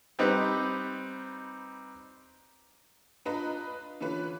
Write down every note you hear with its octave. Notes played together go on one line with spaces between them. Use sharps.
G3 C4 D#4 B4
D4 F4 B4 D#5 A#5
D3 E3 C#4 F4 B4